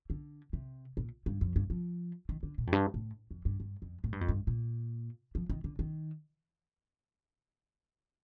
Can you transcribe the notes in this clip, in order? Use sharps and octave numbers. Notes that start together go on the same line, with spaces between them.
D3
C3
A#2
G2
F2
G2
F3
D#3
D3
A#2
F2
G2
A2
F2
G2
G2
F2
A2
G2
F2
G2
A#2
F3
D#3
D3
D#3